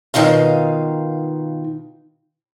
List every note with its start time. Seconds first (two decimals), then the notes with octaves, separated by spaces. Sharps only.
0.14 B2 D#3 D#4 F4 F5